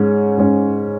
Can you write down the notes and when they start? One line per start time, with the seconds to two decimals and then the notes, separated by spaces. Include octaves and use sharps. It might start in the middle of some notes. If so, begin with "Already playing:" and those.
Already playing: G#2 G#3 C#4
0.37 G#2 G#3 C#4